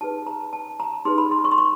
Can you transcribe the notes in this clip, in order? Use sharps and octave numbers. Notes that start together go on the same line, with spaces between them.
D#4 G#4 B4 A5
A#5
A5
A#5
D#4 G#4 B4 C6
B5
C6
C#6
C6
C#6